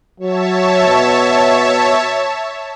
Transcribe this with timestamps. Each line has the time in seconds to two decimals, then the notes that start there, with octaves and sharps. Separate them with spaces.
0.20 F#3 C#5 E5 A5
0.87 B2